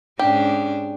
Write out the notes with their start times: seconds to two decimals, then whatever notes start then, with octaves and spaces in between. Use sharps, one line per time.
0.19 G#2 C#4 D4 G4